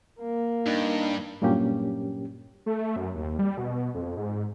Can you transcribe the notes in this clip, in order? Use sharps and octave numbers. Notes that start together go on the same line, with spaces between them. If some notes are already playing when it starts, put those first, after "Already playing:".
A#3
G2 D4 D#4
G2 A#2 F#3 A#3 C#4 G4
A3
F#2
D#2
G3
B2
F2
G#2